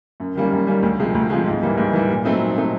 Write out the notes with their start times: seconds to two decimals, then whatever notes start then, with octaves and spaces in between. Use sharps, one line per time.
0.20 F#2
0.35 D#3 G3 A#3 C#4
0.52 F#2
0.67 D#3 G3 A#3 C#4
0.82 D2
0.99 C3 F3 G#3
1.15 D2
1.30 C3 F3 G#3
1.46 G#2
1.63 E3 G3 A#3
1.78 G#2
1.93 E3 G3 A#3
2.09 A#2
2.25 F#3 A3 C4 D#4
2.41 A#2
2.57 F#3 A3 C4 D#4